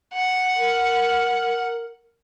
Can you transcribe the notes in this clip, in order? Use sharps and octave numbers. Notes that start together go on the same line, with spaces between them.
F#5
A#4